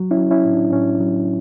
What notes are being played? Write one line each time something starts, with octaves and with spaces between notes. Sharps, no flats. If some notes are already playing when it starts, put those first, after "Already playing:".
Already playing: F#3
C#4 E4
F#3
C#4 E4
A2
D4
A2 C#4
F#3